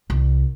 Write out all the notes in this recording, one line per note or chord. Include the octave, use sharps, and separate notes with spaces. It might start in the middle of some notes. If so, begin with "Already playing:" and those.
C2